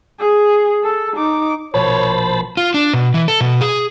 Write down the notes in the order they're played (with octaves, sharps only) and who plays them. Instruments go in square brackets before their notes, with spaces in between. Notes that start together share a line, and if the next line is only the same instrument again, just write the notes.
[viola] G#4
A4
D#4 D6
[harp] A#1 B2 [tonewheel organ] C5 A5 B5 [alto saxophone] C#5
[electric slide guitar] F4
D4
B2
E3
A4
B2
G#4